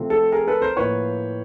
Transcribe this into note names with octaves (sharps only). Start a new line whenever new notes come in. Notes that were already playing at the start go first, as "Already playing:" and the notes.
Already playing: C3 F3 A3 C4
A4
G#4 A#4
A4 B4
A#4 C5
A2 F3 A#3 B4 C#5